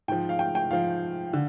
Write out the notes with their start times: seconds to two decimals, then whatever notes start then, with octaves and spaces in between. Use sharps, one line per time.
0.08 G#2 F3 G5
0.29 F5
0.39 G5
0.55 G5
0.70 G#2 F3 F5
1.33 D3